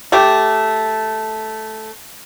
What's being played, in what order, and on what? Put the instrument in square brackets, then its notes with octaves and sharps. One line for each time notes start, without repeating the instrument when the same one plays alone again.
[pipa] A3 G4